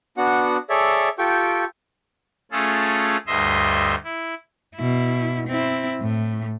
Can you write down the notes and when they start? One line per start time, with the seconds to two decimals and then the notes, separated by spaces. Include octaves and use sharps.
0.17 B3 D4 F#4 F#5
0.70 G#4 A4 C#5 D5 E5
1.18 F4 G4 A4 G5 C#6
2.52 A3 C#4 F4 G#4 A4
3.27 D2 G2 D#5 E5 C6
4.04 E4
4.75 B2 E4
5.47 C4 E4
6.01 A2